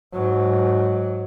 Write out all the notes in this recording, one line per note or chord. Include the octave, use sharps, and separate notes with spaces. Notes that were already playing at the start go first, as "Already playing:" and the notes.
G#2 F#3